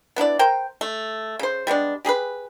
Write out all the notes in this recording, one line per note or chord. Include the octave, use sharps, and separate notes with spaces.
B3 D4 E4 D5
A#4 C5 G5
A3
C#3 C5
G3 G#3 B3 D4
G4 G#4 A#4 B4